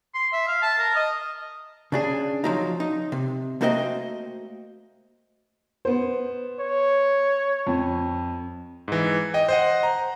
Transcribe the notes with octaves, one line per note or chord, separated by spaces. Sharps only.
C6
E5
F5
A5
A#4
D#5
C#3 D4 G#4
F3 F#3 D#4
D#4
C3
A3 A#3 F#4 C5 D#5 G5
B3 C5
C#5
F2
G#2 E3
D#5 G5
C5 D#5 F#5
A#5